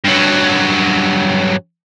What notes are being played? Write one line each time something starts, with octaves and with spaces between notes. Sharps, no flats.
G2 F#3